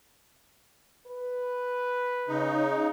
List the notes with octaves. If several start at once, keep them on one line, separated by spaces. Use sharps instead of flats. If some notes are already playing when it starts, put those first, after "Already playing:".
B4
C#3 D#4